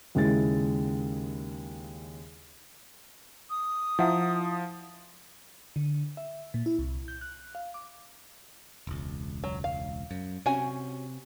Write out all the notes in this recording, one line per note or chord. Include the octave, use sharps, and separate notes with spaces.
D#2 C#3 G#3 E4 A6
D#6
F3 E4 E5 F#5
D3
E5
A#2
E4
C2
G6
F#6
F5
D6
E1 C#2
F#3
F5
F#2
C3 C#4 F#4 G#5